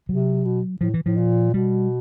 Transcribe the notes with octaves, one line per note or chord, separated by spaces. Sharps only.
C3 F#3
B2
A2 F3
E3
A2 F3
A#2
B2 G3